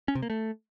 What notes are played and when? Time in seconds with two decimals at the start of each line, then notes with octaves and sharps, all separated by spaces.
0.08 C#4
0.15 C3
0.22 A#3
0.30 A3